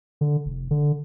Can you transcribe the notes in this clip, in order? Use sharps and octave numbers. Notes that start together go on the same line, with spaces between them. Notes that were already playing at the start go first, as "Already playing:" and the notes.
D3
F1
D3